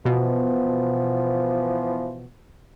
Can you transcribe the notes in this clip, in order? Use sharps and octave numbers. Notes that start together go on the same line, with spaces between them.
B2 E3 F3 B3